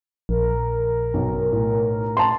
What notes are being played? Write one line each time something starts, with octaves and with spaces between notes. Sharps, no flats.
A#1 A#4
B1
A2
A5 C6